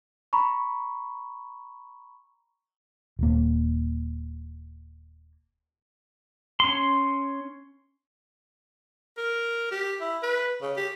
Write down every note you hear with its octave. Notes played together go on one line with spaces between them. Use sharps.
A#5 B5 C#6
D#1 A#3
C#4 C6
A#4
G4
E4
B4
C#3
G4